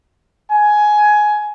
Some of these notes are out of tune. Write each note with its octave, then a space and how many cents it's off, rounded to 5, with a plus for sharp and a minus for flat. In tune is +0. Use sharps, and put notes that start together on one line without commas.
G#5 +15